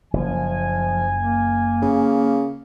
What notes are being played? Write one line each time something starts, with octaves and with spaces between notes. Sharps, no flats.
F#1 F3 G#5
A#3
C#3